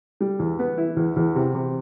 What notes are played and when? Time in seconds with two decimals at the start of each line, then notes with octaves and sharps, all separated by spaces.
0.21 G3
0.39 E2
0.59 B3
0.77 E4
0.96 E2
1.16 E2
1.35 C3
1.55 C3